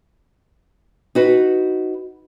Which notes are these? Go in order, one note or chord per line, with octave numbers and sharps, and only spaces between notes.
D#4 F#4 B4